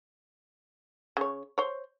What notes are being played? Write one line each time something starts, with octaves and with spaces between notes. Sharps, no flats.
C#3 C#5
C5 C#5